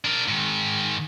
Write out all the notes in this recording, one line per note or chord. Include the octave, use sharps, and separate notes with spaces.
D4 A#4
G#2 D#3